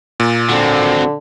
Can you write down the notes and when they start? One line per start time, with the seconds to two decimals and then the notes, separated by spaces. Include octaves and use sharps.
0.20 A#2
0.49 D3 F#3 C4